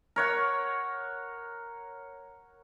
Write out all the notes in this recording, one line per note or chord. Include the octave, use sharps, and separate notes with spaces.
A#4 C#5 F#5